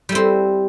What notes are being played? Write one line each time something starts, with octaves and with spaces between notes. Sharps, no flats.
G3 C4 E4